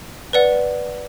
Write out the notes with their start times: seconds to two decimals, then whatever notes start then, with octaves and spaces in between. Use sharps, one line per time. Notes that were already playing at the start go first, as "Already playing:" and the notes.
0.33 B4 D5 F#5